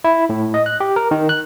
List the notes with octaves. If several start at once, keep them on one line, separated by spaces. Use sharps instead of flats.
E4
A2
D#5
F#6
G4
A#4
D#3
F#6